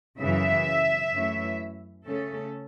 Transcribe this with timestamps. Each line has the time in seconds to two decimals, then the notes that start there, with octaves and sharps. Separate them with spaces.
0.20 F#2 C#3 E3 E5
1.13 F#2 E3 A3 C#4
2.05 C#3 A3 C#4 A4